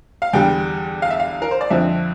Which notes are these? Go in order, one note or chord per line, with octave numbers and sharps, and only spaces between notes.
F5
E2 D3 G3 G5
F5
E5
F5
A#4
C5
D5
F2 D3 F3 C4 E5